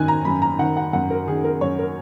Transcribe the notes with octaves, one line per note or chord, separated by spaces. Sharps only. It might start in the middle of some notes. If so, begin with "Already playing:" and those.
Already playing: F#2 D#3 G#5 F#6
A#5
F#2 B5
A#5
D#3 F#5
F#5
F#2 F#5
A#4
D#3 G#4
A#4
F#2 C#5
A#4